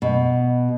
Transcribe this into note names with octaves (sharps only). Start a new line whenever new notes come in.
B2